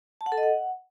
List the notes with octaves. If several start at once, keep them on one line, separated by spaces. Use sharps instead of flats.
A5
F#5
A4
D#5
F#5